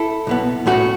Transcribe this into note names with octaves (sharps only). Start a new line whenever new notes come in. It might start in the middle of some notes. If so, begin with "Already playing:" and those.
Already playing: E4 A4
B1 B2 B3
A2 A3 C#4 F#4